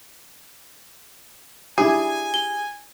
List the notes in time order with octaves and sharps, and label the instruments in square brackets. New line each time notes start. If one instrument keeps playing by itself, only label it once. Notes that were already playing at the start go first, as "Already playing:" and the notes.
[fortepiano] G3 D4 E4 [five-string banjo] G#4 [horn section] G#5
[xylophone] G7